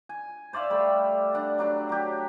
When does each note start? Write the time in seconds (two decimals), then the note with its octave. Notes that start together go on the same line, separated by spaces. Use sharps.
0.09 G#5
0.53 C5 D5 E5 F5
0.70 G3 A3 B5
1.33 D4 F#5
1.58 F#3 D4 G4
1.89 F#3 G4